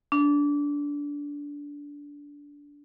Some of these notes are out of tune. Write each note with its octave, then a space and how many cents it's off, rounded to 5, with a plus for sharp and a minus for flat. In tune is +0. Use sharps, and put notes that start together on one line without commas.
D4 -20